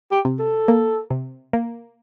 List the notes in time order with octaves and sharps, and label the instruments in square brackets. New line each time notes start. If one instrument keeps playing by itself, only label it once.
[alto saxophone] G4
[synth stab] C3
[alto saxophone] A4
[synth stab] A#3
C3
A#3